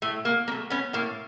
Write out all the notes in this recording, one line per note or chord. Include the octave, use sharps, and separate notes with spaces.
A2 A3
A#3
F#3 A3 A#3
B3 C#4
A2 A#3